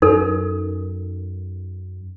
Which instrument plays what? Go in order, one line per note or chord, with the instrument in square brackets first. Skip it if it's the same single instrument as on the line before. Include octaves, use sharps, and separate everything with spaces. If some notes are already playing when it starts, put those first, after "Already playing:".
[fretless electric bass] F#2 [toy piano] D#4 A4 A#4